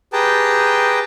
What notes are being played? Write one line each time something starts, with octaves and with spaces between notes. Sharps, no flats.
G4 G#4 B4 G5 A5 A#5